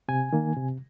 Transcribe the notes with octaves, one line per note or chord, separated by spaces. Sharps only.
C3 G#5
D#3 A#3
C3